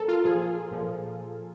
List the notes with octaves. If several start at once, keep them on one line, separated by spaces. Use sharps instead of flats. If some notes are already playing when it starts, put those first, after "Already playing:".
Already playing: A#2 F3 A4 A#4
F4
A#2 F3 G#4
A#2 F3